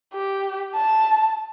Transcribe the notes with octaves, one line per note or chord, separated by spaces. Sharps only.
G4
A5